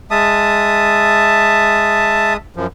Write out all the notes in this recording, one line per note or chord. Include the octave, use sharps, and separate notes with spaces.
G#3 E5 A5 D#6
F#2 F3